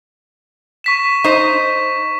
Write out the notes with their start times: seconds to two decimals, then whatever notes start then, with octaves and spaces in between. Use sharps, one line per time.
0.84 C#6 B6 E7
1.24 D#4 C5